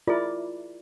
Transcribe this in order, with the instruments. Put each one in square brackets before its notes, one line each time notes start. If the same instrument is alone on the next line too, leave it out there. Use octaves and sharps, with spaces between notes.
[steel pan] E4 A#4 D5 [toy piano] F4 G#4